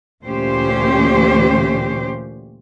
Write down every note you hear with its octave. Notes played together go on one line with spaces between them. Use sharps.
D2 A#2 E3 C#4 G4 C5